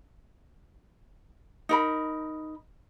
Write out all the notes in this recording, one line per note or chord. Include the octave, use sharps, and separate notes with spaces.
D#4 A#4 B5